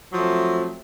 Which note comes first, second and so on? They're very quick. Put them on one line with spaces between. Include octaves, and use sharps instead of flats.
F#3 F3 A3 C4